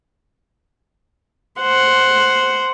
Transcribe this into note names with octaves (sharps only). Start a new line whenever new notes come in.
C5 F#5